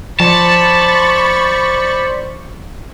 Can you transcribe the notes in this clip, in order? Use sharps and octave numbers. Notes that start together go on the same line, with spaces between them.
F3 C5 D5 A5 B5 C#6 A6